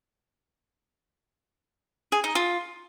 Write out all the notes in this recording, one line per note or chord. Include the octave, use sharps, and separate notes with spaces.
G#4
D#4
F4